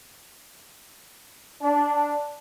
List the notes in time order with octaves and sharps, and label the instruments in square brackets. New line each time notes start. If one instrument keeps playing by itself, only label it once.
[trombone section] D4